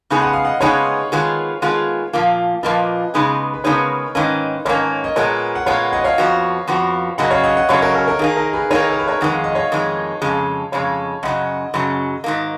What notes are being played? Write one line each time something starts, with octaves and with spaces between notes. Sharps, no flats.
C#3 G#3 B3 D#4 G#4
F#5
F5
D#5 F#5
C#3 G#3 B3 D#4 G#4 C#5 F5
D#3 G#3 B3 F4 G#4
D#3 G#3 B3 F4 G#4
A#2 F3 A#3 F4
A#2 F3 A#3 F4 B4 D#5
C#3 G#3 B3 D#4 G#4
B4
C#3 G#3 B3 D#4 G#4 A#4 C#5
G#2 D#3 A#3 C#4 B4 D#5
G#2 D#3 A#3 C#4 A#4 C#5
D#5
A#2 G#3 B3 A#4 C#5
F#5
A#2 G#3 B3 C#5 F5
D#5 F#5
C#5 F5
F2 F3 B3 F#4
F2 F3 B3 F#4
F#2 C#3 F#3 A#3 C#4 D#5 F#5
C#5 F5
D#5 F#5
D#5 F#5
F#2 C#3 F#3 A#3 C#4 C#5 F5
A#4
A#4
A#4
D#3 A#3 D#4 G#4
A#4
G#4 B4
D#3 A#3 D#4 A#4 C#5
A#4
B4
A#4 C#5
F2 D#3 G#3 F#5
F5
D#5
C#5 F5
F2 D#3 G#3
F2 C#3 G#3
F2 C#3 G#3 C#5 F5
F#2 C#3 F#3 D#5 F#5
F#2 C#3 F#3
G#2 D#3 A#3